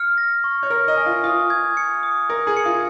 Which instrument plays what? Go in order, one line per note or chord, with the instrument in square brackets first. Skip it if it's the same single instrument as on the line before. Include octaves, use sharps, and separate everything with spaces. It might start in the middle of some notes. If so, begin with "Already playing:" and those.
Already playing: [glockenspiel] F6 C#7
A#6
C#6
[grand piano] C#5
[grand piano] A#4 [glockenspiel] F6
[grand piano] D#5
[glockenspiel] G#5
[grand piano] F4
[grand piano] F4 [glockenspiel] D#6
[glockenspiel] G#6
C#7
D#6
[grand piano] A#4 [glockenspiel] D#6
[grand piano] G#4
[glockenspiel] C#7
[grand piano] F4